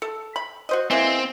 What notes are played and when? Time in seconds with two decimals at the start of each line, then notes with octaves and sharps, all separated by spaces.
0.02 A4
0.36 B5
0.69 F#4 C5 D#5
0.91 E3 G#3 A#3 C4